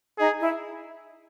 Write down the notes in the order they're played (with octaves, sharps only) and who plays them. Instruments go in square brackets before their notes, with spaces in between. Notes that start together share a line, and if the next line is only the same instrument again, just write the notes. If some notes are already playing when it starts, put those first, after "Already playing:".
[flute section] D#4 D#5 [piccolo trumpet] G#4
[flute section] E4 E5